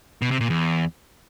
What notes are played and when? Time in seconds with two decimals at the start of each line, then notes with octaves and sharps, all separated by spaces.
0.22 B2
0.31 C3
0.41 A#2
0.50 E2